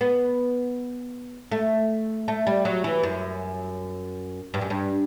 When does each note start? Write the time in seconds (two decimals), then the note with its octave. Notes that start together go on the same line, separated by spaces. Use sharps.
0.01 B3
1.52 A3
2.28 A3
2.47 G3
2.65 F#3
2.84 E3
3.03 F#2
4.54 G2
4.61 F#2
4.70 G2